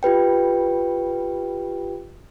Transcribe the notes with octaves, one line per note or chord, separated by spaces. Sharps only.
F4 G4 B4 G5